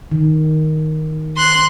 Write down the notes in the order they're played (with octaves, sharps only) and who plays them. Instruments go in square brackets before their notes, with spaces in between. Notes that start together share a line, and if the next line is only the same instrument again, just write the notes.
[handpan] D#3
[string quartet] C6 F#6